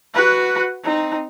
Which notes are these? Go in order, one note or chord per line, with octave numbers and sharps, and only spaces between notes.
F#4 B4
C4 D#4